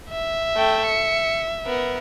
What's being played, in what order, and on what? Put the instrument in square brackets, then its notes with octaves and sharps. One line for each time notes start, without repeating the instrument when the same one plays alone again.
[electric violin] E5
[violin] A3 G5
C#7
B3 A#4